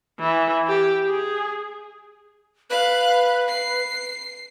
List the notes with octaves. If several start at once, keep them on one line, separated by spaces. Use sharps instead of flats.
E3
G4
G#4
B4 F5 F#6
C7